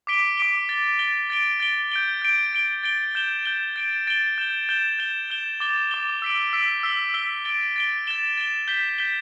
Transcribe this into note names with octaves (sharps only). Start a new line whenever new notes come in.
D6 B6 D7 G7
D6 B6 D7 G7
A6 G7
A6 G7
A6 D7 G7
A6 D7 G7
G6 D7 G7
G6 D7 G7
A6 D7 G7
A6 D7 G7
G6 E7 G7
G6 E7 G7
A6 D7 G7
A6 D7 G7
G6 E7 G7
G6 E7 G7
G6 E7 G7
G6 E7 G7
D6 A6 G7
D6 A6 G7
E6 B6 D7
E6 B6 D7
E6 B6 G7
E6 B6 G7
A6 D7 G7
A6 D7 G7
A6 E7 G7
A6 E7 G7
G6 B6 E7 G7
G6 B6 E7 G7